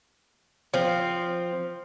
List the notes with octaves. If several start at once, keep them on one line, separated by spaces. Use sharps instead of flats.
F3 C4